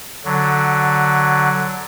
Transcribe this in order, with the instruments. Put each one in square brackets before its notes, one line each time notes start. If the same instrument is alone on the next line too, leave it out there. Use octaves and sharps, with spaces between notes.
[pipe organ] D3 F#3